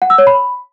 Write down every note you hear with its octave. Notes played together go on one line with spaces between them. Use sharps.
F#5
E6
C#5
B5